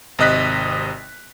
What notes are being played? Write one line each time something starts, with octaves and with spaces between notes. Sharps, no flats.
G#1 C3 D#5 F#6 B6